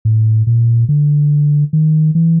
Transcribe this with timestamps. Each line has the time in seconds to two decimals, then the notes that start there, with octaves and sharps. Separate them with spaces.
0.05 A2
0.47 A#2
0.89 D3
1.73 D#3
2.15 E3